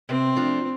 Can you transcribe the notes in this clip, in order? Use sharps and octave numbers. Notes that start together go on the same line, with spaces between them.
C3 C4
F3 A3 D4 F4